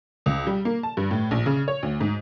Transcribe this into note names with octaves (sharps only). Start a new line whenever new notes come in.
C#2
G3
A#3
A5
G2
A2
A#1
C#3
C#5
D2
G#2